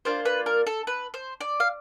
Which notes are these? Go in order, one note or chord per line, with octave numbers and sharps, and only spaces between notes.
A#3 D4 F4 C5
B4
A#4
A4
B4
C5
D5
F5